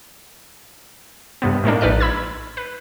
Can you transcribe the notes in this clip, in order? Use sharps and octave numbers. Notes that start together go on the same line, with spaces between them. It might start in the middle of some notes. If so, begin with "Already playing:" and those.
G2 C3 B3
A2 G#3 A#3 D4
A#1 D#4 B4 D5 F6
B5 E6 G#6
B4